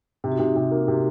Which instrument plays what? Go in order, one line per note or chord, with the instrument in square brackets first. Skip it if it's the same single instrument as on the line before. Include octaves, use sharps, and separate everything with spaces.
[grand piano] C3 [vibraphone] D#4
[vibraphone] F#4
[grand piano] C3 [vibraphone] D#4
[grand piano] C3
A#3
C3